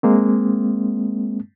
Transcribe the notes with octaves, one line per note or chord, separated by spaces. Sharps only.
G#3 A#3 C4